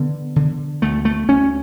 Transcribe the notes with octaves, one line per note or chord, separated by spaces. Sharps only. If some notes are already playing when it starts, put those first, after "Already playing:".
Already playing: D3 B3
D3
D2 A3
A3
D2 C#4